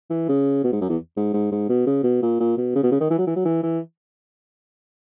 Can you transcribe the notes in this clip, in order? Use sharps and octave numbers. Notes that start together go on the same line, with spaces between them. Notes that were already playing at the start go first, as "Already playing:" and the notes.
E3
C#3
B2
G#2
F#2
E2
G#2
G#2
G#2
B2
C#3
B2
A#2
A#2
B2
C#3
B2
C#3
D#3
E3
F#3
E3
F#3
E3
E3